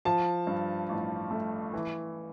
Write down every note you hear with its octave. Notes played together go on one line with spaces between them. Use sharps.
F3 A5
G2
A1
A3
E3